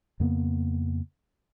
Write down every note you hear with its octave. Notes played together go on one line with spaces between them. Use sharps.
F2 C#3 A#3 B3